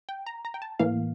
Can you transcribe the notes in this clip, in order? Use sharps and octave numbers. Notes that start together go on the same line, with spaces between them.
G5
A#5
A#5
G5
A5
A2 E3 A#3 F5